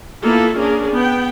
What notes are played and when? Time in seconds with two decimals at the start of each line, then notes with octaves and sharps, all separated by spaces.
0.23 A#3 B3 E4 F4 A4
0.56 A#3 C#4 D4 G#4 A#4
0.92 B3 G5